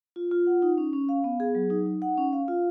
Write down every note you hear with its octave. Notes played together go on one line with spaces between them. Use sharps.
F4
F4
F#5
D#4
C#4
C#4
F5
B3
G#4
F#3
D#4
D#4
F#5
C#4
F5
F4